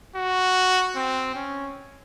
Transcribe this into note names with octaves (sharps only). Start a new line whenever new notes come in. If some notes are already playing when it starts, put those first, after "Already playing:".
F#4
C4
C#4